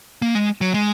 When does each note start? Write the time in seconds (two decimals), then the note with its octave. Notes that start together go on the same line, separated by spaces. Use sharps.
0.22 A#3
0.35 G#3
0.61 F#3
0.74 G#3